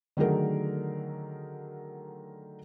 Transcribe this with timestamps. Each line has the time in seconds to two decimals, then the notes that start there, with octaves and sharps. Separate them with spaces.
0.17 D3 D#3 F#3 A3 G#4 A#4